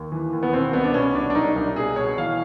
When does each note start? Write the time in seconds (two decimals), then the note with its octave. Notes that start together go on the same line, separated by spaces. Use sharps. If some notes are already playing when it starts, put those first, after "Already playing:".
Already playing: D#2
0.12 E3
0.33 D#2
0.43 B3
0.53 B2 C4
0.73 C2 B3
0.84 D4
0.94 B2 C#4
1.14 C2 D4
1.30 D4
1.35 C2 D#4
1.56 C2
1.76 B2 G#4
1.96 B2 C#5
2.18 E3 F5